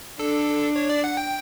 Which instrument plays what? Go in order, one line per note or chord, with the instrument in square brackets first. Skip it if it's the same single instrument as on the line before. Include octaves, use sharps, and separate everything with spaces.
[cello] D4 [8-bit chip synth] A4
[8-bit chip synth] C#5
D5
F#5
G5